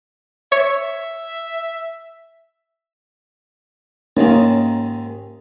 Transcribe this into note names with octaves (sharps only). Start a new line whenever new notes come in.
C#5 E5
D#2 G#2 D#3 A#3 C#4 D#4